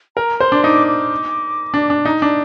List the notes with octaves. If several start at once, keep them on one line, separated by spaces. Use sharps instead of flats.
A#4 A#5
C5 C6
D4
D#4 D6
D6
D4
D4
D#4 A#5
D4